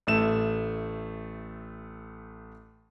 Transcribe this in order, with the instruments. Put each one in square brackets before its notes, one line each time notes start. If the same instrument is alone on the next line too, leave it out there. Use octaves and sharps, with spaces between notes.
[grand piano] A1 A3 E7